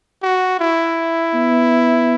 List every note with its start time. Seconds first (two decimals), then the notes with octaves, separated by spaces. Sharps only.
0.23 F#4
0.60 E4
1.34 B3